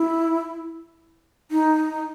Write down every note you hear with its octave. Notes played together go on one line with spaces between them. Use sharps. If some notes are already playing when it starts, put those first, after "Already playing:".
Already playing: E4
D#4